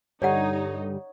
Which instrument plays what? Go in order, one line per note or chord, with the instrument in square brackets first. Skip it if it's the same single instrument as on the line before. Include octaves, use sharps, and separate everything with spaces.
[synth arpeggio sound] G2 D3 G3 [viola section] D#4 [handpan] C#5 [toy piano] D5 F#5